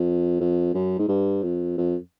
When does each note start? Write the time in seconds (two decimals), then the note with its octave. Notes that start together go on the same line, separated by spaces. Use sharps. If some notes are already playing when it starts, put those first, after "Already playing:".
Already playing: F2
0.40 F2
0.74 F#2
0.99 G#2
1.08 G2
1.42 F2
1.78 F2